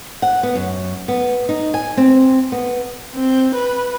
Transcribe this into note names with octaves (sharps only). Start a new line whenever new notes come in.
F#5
B3
F#2
B3
D#4
G#5
C4
B3
C4
B4